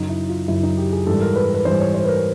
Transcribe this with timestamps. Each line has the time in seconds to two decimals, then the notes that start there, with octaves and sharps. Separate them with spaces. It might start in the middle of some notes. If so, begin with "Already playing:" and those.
Already playing: F#2 C#3 F#3 D#4
0.09 E4
0.29 F4
0.48 F#2 C#3 F#3 E4
0.63 D#4
0.78 G4
0.92 G#4
1.07 G#2 E3 G3 A4
1.21 A#4
1.36 B4
1.54 B4
1.65 G#2 E3 G3 C5
1.80 C#5
1.94 C5
2.05 B4
2.08 A#4